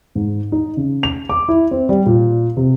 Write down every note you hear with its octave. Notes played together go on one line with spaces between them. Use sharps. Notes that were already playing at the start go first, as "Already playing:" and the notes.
G#2
D#4
C#3
F7
D6
E4
C4
G3
A#2
C3